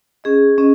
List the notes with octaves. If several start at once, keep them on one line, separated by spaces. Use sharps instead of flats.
C#4 G#4 D#5
C#4 G#4 D#5